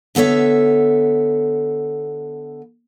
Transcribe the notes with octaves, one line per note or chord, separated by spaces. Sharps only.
D3 B3 A4 C#5 E5